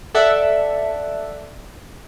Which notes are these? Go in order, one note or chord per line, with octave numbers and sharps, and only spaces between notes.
A4 D5 E5 F#5